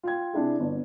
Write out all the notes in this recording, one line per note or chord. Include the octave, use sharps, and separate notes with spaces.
F4 G5 G#6
C3 D4 E4 G#4
G1